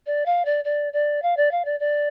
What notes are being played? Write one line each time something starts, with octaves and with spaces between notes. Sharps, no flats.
D5
F5
D5
D5
D5
F5
D5
F5
D5
D5